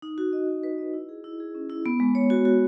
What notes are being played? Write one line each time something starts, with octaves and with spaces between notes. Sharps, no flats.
D#4
F#4
D#5
F#4
B4
D#5
E4
G#4
E4
G#4
C#4
E4
B3
G#3
C#5
F#4
F#4